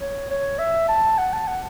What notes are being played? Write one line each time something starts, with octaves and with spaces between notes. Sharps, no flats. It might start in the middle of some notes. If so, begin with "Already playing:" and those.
C#5
C#5
E5
A5
F#5
A5
F#5